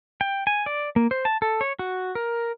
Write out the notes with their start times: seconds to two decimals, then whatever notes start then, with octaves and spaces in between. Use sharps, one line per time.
0.21 G5
0.47 G#5
0.66 D5
0.96 A#3
1.11 C5
1.25 A5
1.42 A4
1.61 C#5
1.79 F#4
2.15 A#4